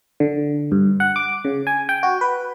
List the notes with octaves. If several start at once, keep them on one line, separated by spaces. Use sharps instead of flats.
D3
G2
F#5
D6
C#3
G#5
G5
F#4
B4